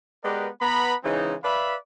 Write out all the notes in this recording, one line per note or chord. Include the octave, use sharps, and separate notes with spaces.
G#3 B3 G4 A#4 B4 D5
B3 A#5 B5
C#3 E3 G#3 C4 D#4
B4 D5 E5 F5 B5